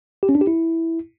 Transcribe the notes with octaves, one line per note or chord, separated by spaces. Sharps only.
G4
C#4
D4
G4
E4